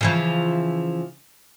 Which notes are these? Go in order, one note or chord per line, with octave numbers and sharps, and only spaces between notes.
C#3 E3 F3